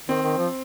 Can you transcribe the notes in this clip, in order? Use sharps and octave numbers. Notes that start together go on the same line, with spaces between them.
D#3 C4
D#3
F3